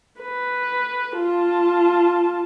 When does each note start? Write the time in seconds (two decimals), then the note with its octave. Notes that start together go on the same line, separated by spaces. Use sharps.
0.22 B4
1.17 F4 A5